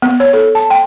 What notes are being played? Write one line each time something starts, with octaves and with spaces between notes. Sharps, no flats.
B3
C#5
A4
A5
G5